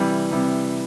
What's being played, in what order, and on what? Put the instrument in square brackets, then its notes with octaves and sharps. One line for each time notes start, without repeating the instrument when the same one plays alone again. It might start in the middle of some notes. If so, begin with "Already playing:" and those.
Already playing: [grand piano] C3 E3 G3
C3 E3 G3